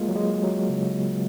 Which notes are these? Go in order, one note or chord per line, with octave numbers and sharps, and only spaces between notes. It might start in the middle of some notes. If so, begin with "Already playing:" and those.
Already playing: G#3 A#3 F4
F#3
G#3
F#3
C#3